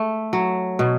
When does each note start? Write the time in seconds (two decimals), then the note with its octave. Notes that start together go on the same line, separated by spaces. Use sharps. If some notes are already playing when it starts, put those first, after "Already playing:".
Already playing: A3
0.33 F#3
0.79 B2